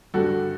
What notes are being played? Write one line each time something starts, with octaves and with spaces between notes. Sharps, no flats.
G2 D3 G3 F#4 A4